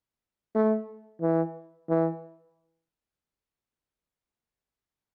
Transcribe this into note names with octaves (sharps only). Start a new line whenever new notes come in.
A3
E3
E3